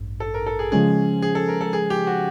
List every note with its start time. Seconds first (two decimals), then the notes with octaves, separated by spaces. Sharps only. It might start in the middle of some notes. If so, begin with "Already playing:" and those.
Already playing: A1 G2
0.20 A4
0.34 A#4
0.46 A4
0.59 G#4
0.72 C#3 F3 G#3 C#4 G#4
1.22 G#4
1.35 A4
1.48 A#4
1.61 A4
1.73 G#4
1.90 G4
2.07 F#4